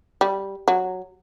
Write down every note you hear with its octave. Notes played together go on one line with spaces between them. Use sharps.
G3
F#3